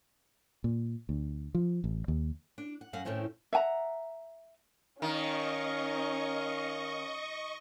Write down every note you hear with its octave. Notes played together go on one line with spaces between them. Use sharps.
A#2
D2
F3
A1
D#2
D4
F#5
F#2 F#3 F5 F#5
A2 D#3 A3 C4 C#4
E5 F#5 G#5 A#5
D#3 C#4 A#4 D#5 F5 C#6